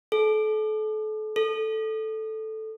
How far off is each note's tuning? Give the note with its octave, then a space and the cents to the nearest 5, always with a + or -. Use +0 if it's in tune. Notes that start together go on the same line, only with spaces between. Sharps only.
A4 -35
A4 -5